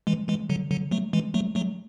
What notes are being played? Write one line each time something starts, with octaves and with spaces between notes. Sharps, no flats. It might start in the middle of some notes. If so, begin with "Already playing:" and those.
E3 G#3
E3 G#3
D3 F#3
D3 F#3
F#3 A3
E3 G#3
F#3 A3
F#3 A3